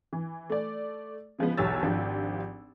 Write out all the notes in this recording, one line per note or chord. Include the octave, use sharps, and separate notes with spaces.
E3
A3 D5
C#3 F3 G#3 B3
B1 E2 G4 C#5 E6 A6
G#1 F3 D4 G4